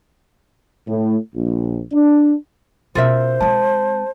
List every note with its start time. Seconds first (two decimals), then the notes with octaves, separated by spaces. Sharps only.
0.86 A2
1.34 A#1
1.92 D4
2.95 B2 C#4 F4 A#4 C5 E5
3.41 G#3 C4 A5